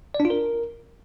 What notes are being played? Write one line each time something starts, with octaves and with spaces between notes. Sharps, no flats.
D5
D4
F4
A#4